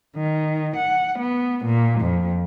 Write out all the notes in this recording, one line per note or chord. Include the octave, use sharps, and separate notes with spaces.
D#3
F#5
B3
A#2
F2